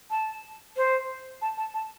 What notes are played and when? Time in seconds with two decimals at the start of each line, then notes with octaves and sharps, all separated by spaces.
0.11 A5
0.77 C5
1.42 A5
1.57 A5
1.74 A5